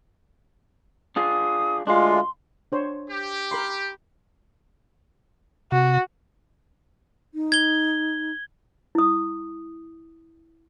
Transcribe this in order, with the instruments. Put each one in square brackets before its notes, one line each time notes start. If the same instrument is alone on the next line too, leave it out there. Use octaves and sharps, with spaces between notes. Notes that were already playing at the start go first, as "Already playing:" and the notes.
[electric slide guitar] D4 F4 G#4 [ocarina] D#6
[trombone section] D2 A3 F4 [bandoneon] G#3 [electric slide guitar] D4 F5 [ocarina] C6
[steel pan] D4 C5 C#5
[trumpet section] G4
[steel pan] A#4 B5 C6
[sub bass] C3 [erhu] F#4
[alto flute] D#4
[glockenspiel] G#6 G7
[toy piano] E4 D#6